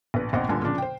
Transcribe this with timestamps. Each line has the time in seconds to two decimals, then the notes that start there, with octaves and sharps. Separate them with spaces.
0.14 A#1 B4
0.33 A#1 D#2 C3 C5 D#5 F#5
0.49 G2 A#2 D3 G#5 A5
0.62 A#2 C#3 F3 D4
0.78 C5 G5